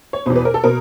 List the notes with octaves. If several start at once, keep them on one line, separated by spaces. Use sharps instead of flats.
C#5
E2 B2 C5
B4
A#4
A4
B2 A#4